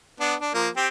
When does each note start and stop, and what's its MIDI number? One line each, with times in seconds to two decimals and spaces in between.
0.20 0.35 59
0.20 0.35 62
0.40 0.53 62
0.54 0.69 53
0.54 0.69 58
0.77 0.88 60
0.77 0.88 67